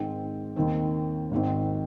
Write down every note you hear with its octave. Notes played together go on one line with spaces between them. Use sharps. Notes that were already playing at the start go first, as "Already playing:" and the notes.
Already playing: G#2 D#3 G#3 C4
D#2 D#3 C4
G#1 G#2 D#3 C4